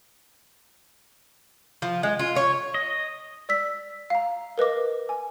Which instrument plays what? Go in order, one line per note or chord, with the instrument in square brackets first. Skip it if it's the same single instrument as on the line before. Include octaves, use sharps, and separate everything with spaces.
[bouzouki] F3
G#3
F4
C#5
[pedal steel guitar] D#5
[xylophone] D5 E6 B6
F5 A#5
A#4 B4 D#5 D6
G#5